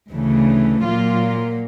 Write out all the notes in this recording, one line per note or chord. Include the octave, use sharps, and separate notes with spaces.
D2 C#3 E3 A3
A#2 F#3 A#3 F4